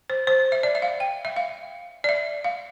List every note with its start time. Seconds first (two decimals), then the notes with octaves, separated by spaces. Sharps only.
0.10 C5
0.27 C5
0.52 E5
0.63 D5
0.75 E5
0.82 F5
1.00 G5
1.25 E5
1.36 F5
2.04 D5
2.09 E5
2.44 F5